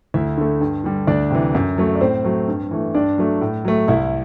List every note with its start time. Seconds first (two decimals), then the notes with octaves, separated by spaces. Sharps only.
0.14 D2 E4 E5
0.38 D3 A3
0.61 G2
0.84 D3 G3
1.07 D2 D4 D5
1.31 C3 E3
1.55 F#2
1.78 F#3 A3
1.95 D5
2.01 A2 C4 C5
2.24 F#3 A3
2.48 G2
2.71 E3 A3
2.94 G2 D4 D5
3.18 F#3 A3
3.41 A2
3.65 F#3 A3
3.88 C2 E4 E5